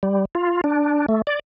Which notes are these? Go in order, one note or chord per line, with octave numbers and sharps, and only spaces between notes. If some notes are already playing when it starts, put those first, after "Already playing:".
G3
F4
D4
A3
D5